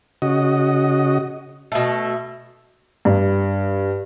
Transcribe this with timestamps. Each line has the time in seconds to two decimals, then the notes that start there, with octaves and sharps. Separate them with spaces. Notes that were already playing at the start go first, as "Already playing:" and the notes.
0.22 C#3 F#4 D#5
1.72 B2 A3
3.05 G2